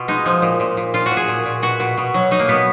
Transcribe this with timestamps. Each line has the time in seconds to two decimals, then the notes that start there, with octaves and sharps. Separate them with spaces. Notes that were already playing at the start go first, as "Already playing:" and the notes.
Already playing: B2 F4
0.08 G#3 D#4
0.26 F3
0.42 A#2
0.60 A#2
0.77 A#2
0.94 A#2 F4
1.06 F#4
1.11 A#2
1.17 G#4
1.28 A#2
1.45 A#2
1.62 B2 F#4
1.80 B2
1.98 B2
2.14 F#3
2.31 F#3 D#4
2.40 A#3
2.48 B2 B3